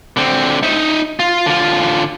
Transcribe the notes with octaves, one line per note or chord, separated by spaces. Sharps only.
D3 C4
D#4 E5
F4
D3 F4